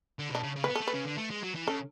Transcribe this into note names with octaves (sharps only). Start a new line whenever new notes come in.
D3
B2 D4
C#3
C#3
B3 B4
A4
A3
B4
C#3
D3
A3
G#3
F#3
E3
C#3 A4